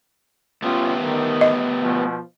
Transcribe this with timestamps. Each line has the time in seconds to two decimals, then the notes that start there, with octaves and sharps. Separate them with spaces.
0.62 A3 B3 C#4 F4 G4
1.01 D#3
1.41 D#5
1.82 B2 F3